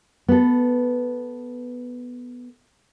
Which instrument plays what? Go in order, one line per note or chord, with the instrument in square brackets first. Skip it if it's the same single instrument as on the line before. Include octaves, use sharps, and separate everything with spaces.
[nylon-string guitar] B3 A4